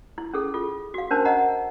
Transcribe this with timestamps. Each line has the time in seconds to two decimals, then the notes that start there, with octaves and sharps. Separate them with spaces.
0.18 E4
0.33 C#4 G#4 A4
0.54 F4 A4
0.94 F#4 F5
1.10 C#4 D4 A#4 C5 A5
1.25 D#5 F#5 A#5